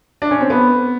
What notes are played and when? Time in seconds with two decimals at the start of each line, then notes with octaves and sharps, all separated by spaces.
0.22 D4
0.31 C#4
0.41 C4
0.50 B3